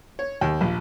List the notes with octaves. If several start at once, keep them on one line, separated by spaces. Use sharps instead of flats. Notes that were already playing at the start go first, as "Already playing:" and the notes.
C#5
D#2
A#1